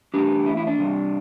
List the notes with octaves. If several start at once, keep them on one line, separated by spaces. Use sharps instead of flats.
E2 E3 A3 D4 G4
E4
E4
D4
C3 G3 C4